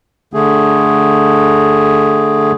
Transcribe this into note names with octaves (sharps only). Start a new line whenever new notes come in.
D3 A3 G#4